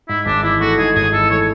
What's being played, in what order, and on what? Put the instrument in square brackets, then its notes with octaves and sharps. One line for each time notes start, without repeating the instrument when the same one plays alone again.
[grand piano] G#2 [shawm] E4
[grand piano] G#1 [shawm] D4
[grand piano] E3 [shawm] E4
[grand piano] A3 [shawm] F#4
[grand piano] G#2 [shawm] G#4
[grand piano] G#1 [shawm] G#4
[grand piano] E3 [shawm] A4
[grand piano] A3 [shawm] C#5